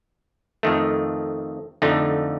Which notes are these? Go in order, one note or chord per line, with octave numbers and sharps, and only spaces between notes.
F2 D#3 A3
F2 D3 A3 D#4